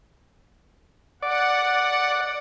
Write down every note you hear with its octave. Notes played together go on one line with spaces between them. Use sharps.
D5 F#5